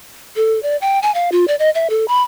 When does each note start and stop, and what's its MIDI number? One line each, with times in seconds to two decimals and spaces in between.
0.36 0.61 69
0.63 0.77 74
0.81 0.99 79
1.03 1.13 80
1.14 1.30 77
1.32 1.45 65
1.48 1.55 74
1.59 1.70 75
1.75 1.88 76
1.90 2.05 69
2.08 2.23 83